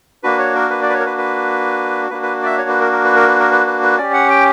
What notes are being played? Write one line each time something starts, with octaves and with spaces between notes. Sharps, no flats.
A#3 D4 F#4 B4
C#5
A#4
B4
D5
B4
C#5
A#4
B4
B4
A#3 D4 F#4 B4
B4
D5
E5
C#5
B4
A#4
A#4
B4
A#4
B4
A#4
B4
B4
B4
C#4 G4 D5
F#5
G5